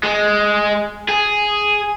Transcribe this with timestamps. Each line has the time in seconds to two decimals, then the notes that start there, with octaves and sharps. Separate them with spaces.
0.04 G#3
1.09 G#4